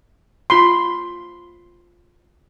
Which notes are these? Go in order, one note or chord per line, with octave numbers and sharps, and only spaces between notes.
F4 B5 C6